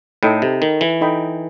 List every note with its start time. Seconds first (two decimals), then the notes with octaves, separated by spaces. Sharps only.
0.23 A2 D#4 A4 D#5 G5 B5
0.42 C3
0.62 D#3
0.81 E3
1.01 D#4 A4 D#5 G5 B5